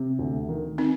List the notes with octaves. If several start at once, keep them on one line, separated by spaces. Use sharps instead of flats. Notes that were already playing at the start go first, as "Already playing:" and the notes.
Already playing: C3
D2
D#3
C4 D#4